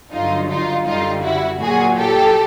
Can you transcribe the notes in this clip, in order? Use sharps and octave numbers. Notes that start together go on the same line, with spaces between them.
G2 D3 F#3 D#4 F4
D#4 F4
F#2 D3 G3 D#4 F4
E4 F#4
A#2 F#3 F#4 G#4
G4 A4